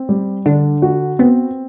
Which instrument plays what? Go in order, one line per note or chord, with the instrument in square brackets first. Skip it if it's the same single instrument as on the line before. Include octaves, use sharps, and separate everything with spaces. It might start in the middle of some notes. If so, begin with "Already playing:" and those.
Already playing: [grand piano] C4
G3
[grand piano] D3 [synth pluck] D4
[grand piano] F#4
[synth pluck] B3 [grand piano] C4